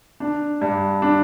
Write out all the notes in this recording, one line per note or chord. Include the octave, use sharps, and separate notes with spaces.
D4
G2
D4